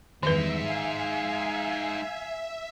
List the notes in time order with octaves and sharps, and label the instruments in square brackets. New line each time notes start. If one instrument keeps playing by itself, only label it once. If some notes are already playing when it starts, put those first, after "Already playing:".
[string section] E2 G2 [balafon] D#3 B4 [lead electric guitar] G#3 D#4 [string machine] E5
[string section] F5 G#5